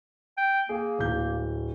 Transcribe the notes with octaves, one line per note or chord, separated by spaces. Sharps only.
G5
A#3 G#4
D1 G6